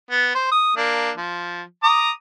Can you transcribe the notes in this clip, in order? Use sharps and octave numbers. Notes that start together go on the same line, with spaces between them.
B3
C5
D#6
A#3 D4
F3
A#5 D6 D#6